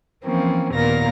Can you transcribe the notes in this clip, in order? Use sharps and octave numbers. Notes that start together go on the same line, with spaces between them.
E3 F3 A#3 C4 C#4
D#2 A#2 B3 A#4 F5 A#6